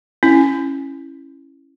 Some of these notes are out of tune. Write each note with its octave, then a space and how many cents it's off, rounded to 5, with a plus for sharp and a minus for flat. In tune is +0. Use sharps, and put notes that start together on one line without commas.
C#4 -10 E4 +0